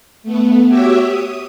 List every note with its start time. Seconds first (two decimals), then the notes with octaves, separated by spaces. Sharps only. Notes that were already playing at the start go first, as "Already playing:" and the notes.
0.23 A3 B3
0.67 F#4 G4 C#5 E5 D6 E6
1.03 D#6